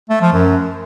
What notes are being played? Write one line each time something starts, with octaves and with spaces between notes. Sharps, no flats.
A3
F3
F#2